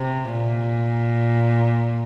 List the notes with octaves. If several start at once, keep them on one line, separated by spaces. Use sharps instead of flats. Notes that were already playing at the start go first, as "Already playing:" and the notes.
Already playing: C3
A#2